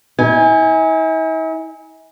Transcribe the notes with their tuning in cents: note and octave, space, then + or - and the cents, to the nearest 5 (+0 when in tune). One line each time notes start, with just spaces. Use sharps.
E4 -45 G#5 -10